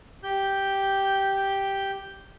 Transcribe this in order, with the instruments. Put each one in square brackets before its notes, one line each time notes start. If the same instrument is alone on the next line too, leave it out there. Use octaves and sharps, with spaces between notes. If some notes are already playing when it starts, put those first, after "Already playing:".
[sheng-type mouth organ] G4 G6